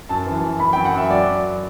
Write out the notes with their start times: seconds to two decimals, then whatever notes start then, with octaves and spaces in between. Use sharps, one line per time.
0.09 F#2 A5
0.26 E3
0.44 F#2
0.60 F#2 B5
0.73 G5
0.76 F#2
0.85 F#5
0.94 F#2 E5
1.10 F#3 D5